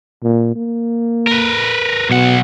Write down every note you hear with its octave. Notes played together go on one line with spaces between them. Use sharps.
A#2
A#3
A#4 B4
B1 B2 F#5